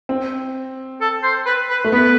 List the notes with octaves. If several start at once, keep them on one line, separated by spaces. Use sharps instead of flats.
C4
A4
C5
B4
B4
A3
B3 B4